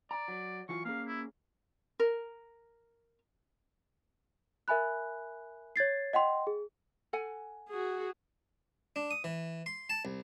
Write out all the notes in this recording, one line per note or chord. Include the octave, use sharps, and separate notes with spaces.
D5 A#5
F#3
E3 F#3 F4 C#6
A#3 C#4 G#4 F5
E4
A#4
A#4 E5 G#5 B5 F#6
C#5 G#6 A6 C7
D#5 F#5 G5 C6
G#4
A4 F#5 G#5
F#4 G#4
D4
D#6
E3
C6
A5
C2